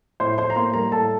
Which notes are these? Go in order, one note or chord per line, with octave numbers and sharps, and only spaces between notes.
A2 C5 C6
A2 C5 C6
A#5
A#3 C5 C6
G3 A#4 A#5
A2 A4 A5